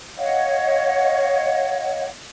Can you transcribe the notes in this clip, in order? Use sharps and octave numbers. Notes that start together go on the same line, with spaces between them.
C#5 D#5 F5 F#5